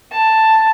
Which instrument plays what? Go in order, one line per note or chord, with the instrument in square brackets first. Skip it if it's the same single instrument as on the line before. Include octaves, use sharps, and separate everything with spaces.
[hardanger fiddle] A5